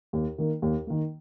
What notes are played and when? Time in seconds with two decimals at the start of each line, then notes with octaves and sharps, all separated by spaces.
0.13 D#2
0.38 D#3 A#3
0.62 D#2
0.87 D#3 A#3